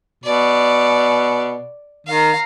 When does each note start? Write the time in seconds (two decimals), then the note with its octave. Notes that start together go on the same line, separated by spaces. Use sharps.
0.24 B2 D5
2.07 D#3 F5 A#5